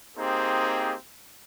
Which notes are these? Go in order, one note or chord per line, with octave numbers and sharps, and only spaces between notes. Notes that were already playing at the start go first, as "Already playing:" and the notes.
A#3 C4 D#4 G4 G#4 C5